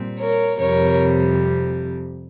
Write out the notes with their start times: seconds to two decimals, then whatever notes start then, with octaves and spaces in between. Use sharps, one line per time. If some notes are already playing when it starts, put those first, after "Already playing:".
Already playing: A#2 G3 C4
0.19 A#4 C#5
0.59 F2 C3 G3 A#4 C#5